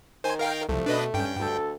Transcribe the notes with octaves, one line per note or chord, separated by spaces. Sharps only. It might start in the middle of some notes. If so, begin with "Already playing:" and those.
D#3 C5 G#5
A#4 F5 G5
C2 F3 A3
B2 D4 B4 D#5
G2 C#4 G5
D2 A4